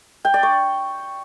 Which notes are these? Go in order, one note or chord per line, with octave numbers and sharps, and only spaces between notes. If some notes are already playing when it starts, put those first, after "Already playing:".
G5
D5
C#6